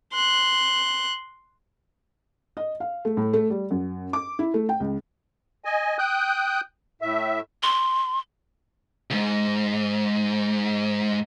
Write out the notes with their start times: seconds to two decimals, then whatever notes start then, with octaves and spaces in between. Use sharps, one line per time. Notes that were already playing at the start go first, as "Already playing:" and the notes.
0.13 C6 F#6
2.57 D#5
2.80 F5
3.05 A3
3.17 A2
3.33 A3
3.50 G3
3.71 F#2
4.13 D6
4.39 E4
4.54 A3
4.69 G5
4.80 C#2
5.65 D#5 G#5
5.99 G5 D#6 F#6 G6
7.02 A2 E5
7.63 C6
9.10 C2 G#2